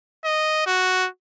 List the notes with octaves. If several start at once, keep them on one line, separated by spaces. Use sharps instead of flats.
D#5
F#4